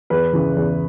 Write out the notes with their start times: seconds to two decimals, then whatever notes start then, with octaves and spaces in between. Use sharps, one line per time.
0.10 E2 B4
0.33 C#3 E3
0.56 E2